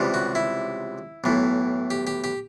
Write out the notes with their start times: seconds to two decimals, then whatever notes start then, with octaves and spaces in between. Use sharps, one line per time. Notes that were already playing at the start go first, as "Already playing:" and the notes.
Already playing: C#2 C3 E3 G3
0.14 F#4
0.35 E4
1.24 B1 A2 E3
1.91 G4
2.07 G4
2.24 G4